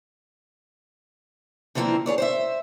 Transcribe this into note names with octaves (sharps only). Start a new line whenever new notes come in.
D3 E3 F3 A3 A#3 C4
G#4 B4 C#5 D5
C5 C#5 E5